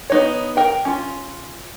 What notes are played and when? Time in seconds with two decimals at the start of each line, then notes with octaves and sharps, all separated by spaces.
0.10 B3 D#4 C#5
0.57 A#4 G5
0.85 C#4 F4